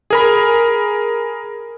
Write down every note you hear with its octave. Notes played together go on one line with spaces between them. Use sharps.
G#4 A#4 B5